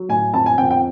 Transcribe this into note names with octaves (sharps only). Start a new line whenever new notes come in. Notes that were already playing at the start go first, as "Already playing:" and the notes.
Already playing: F#3
A2 G#5
F2 A5
G#5
F2 G5
G5